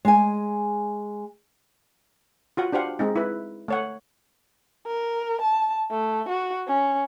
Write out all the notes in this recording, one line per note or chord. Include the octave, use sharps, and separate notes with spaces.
G#3 G#5
F4 F#4 F#5
D4 G4 C5 F5 F#5
G#3 C4 D#4
E4 B4
A3 C#5 F#5
A#4
A5
A3
F#4
C#4